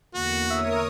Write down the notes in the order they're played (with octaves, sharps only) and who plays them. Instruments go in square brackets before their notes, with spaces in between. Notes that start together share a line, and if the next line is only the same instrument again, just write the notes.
[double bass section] E2 D3 A#3 [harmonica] F#4
[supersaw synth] A#4 C#5 D#6 [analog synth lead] E5